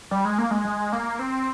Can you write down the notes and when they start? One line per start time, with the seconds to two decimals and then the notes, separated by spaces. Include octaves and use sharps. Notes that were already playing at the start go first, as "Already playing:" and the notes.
0.11 G3
0.25 G#3
0.38 A#3
0.51 G#3
0.65 G#3
0.93 A#3
1.19 C4